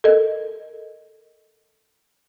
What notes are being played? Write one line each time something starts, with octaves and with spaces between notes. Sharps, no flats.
A4 A#4 D#5